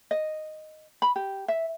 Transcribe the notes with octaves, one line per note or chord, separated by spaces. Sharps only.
D#5
B5
G4
E5